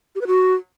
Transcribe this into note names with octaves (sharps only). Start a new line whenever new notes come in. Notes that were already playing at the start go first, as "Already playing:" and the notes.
G4
B4
F#4